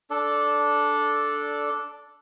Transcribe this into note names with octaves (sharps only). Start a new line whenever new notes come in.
D4 A4 D5